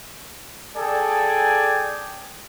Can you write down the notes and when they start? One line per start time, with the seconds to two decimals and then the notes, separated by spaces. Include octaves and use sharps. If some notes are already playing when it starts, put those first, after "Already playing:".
0.77 G#4 A4 D5 G5 G#5